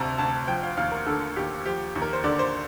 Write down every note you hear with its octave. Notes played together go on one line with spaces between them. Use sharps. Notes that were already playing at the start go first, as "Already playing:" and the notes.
Already playing: D2 C3 A5 A#5
D2 A5
F3 G5
F5
D#2 F5
A#4
D3 A4
D#2 G4
F3 G4
D#2
A#4
C5
D3 D5
C5